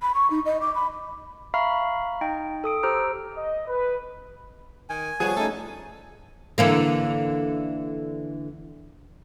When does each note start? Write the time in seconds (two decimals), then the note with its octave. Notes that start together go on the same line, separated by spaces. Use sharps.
0.02 B5
0.15 C#6
0.30 D#4
0.46 D#5
0.61 D6
0.75 B5
1.54 E5 F5 A#5 B5 C#6 F6
2.21 D#4 D#5 G5
2.64 A4 D#6 D7
2.83 G4 C5 A#5 E6 F6 D7
3.35 D#5
3.68 B4
4.90 D#3 G#5
5.20 F3 G3 B3 G#4 C#5
5.37 A3 C#4 D#4 A4
6.58 D3 E3 A#3